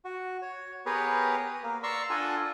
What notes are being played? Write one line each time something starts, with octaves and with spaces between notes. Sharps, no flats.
F#4
C#5
B3 G4 G#4 A#4 B4 C#5
A#3
D5 A#5 C6 C#6 E6
D4 F4 A4 F#5 G#5